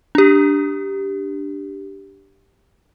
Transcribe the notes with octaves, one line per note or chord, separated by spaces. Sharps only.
D4 G4